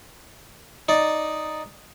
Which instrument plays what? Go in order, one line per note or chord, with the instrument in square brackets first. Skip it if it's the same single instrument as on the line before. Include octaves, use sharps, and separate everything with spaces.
[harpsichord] D#4 D5